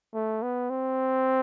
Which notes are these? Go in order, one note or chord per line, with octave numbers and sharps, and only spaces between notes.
A3
B3
C4